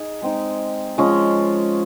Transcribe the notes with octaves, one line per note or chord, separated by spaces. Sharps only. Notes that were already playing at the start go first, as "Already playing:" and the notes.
Already playing: D#4 G#4
G#3 C4 D#4
F3 G#3 C#4 F4